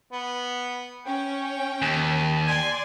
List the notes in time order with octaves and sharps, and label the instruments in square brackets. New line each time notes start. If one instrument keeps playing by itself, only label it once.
[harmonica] B3
[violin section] C#4 [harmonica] G5
[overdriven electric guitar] D#2
[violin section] D5 C6 [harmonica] G#5